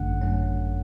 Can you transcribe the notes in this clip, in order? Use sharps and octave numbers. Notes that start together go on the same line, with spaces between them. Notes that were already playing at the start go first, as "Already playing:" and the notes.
Already playing: G#1 F#2 D3 A3 C#4 F#5
G#1 F#2 D3 A3 C#4